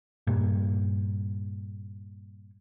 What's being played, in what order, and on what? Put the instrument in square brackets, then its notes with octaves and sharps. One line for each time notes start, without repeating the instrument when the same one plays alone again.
[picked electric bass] G2 A#2